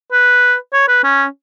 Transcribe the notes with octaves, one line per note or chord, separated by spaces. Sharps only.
B4
C#5
B4
C#4